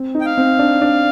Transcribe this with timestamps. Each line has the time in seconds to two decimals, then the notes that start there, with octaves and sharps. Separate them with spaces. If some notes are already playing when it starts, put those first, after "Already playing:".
Already playing: C4
0.15 D#4
0.21 G5
0.26 F5
0.38 C4
0.59 D4
0.81 D4